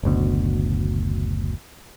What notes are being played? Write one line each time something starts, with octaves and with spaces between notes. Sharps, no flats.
F#1 D2 B2